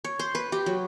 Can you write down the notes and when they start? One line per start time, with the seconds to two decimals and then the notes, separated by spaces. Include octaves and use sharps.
0.05 C#5
0.19 C5
0.35 B4
0.52 G4
0.66 F#3